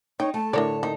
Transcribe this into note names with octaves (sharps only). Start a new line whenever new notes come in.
D#4 C#5 G5
A3 A5
A2 D3 D4 A#4 C#5 D5
D#3 D#4